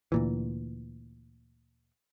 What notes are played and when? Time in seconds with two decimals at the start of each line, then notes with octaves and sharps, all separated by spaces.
0.12 D2 A#2 E3